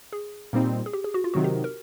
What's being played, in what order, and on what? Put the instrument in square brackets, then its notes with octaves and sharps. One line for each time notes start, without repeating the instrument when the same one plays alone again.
[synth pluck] G#4
[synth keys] A#2 G3 C4 D#4
[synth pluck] G#4
G4
G#4
F#4
F4
[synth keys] C3 D#3 F#3 [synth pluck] F#4
[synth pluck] G4
A#4